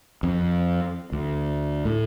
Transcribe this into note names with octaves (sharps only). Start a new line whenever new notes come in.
F2
D2
A2